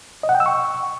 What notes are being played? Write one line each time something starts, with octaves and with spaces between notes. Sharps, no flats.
D#5
F#5
G5
E6
C#6